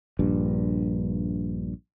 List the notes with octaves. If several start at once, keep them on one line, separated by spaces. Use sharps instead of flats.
A#1 G2